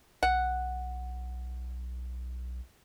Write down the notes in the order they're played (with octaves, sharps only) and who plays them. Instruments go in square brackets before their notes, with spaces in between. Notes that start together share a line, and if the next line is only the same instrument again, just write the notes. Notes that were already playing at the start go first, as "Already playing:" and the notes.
[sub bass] B1 [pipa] F#5